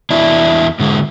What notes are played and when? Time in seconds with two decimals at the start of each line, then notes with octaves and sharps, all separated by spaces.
0.10 E2 D4 E4
0.79 G#2 D3 G#3